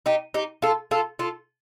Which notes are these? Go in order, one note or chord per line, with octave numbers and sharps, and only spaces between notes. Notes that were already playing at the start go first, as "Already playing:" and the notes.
D#4 G4
D#4 G4
F4 A4
F4 A4
F4 A4